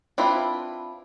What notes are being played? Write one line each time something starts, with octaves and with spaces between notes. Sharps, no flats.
C4 D4 E4 F4 B4